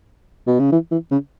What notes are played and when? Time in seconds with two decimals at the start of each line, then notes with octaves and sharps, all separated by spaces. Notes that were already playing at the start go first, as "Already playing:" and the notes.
0.47 B2
0.59 C#3
0.72 E3
0.91 E3
1.11 C#3